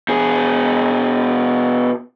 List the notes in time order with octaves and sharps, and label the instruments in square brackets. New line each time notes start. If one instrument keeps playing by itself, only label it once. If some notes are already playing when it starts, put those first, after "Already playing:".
[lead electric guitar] B2 G#4